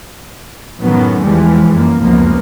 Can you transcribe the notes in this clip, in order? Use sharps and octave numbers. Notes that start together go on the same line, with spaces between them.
F#2 A2 D#3 F#3 B3
E2 E3 F3 G3 G#3
F#2 A#3
F1 C#2 F#2 F3 A#3 B3